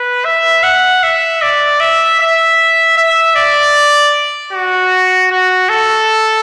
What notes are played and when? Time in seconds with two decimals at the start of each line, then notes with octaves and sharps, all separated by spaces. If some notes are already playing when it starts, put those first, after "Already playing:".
Already playing: B4
0.25 E5
0.63 F#5
1.03 E5
1.42 D5
1.80 E5
2.20 E5
2.97 E5
3.36 D5
4.53 F#4
5.31 F#4
5.69 A4